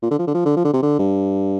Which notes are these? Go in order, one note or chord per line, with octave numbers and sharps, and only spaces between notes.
A#2
D3
F3
D3
F3
D3
F3
D3
C3
D3
G2